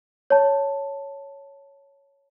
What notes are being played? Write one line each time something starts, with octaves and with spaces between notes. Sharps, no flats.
C#5 A5